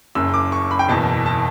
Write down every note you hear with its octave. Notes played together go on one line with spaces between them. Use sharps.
F#1 F#2 C#3 E6
D6
C#6
B5
G5
F#1 E2 B2 A5
A5